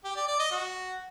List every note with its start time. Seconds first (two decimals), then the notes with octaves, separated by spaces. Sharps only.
0.04 G4
0.16 D5
0.28 D5
0.40 D#5
0.51 F#4